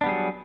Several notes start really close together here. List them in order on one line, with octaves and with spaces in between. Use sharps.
D4 B3 G3 G#4 F#3